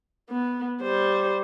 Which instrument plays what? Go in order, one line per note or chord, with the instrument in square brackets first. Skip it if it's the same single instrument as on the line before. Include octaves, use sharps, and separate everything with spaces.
[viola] B3
G3 C5